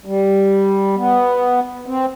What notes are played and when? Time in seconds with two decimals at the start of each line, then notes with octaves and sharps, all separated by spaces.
0.06 G3
0.97 B3
1.86 C4